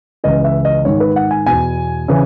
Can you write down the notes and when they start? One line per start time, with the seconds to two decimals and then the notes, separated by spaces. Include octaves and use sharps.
0.24 C#2 C#3 E3 D#5
0.44 E5
0.65 D#5
0.85 G#2 D#3 C#5
1.00 B4
1.16 F#5
1.31 G#5
1.46 E2 B2 G#5
2.08 C#3 E3